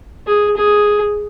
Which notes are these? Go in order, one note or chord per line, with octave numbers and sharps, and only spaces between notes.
G#4
G#4